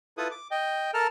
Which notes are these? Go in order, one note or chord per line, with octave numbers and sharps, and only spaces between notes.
E4 F4 A4 B4 D#6
D6
D#5 G5
A4 A#4 A5 F6